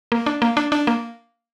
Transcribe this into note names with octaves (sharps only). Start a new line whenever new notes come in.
A#3
D4
A#3
D4
D4
A#3